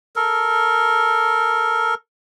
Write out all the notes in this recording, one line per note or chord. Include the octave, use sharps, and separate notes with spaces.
A4 A#4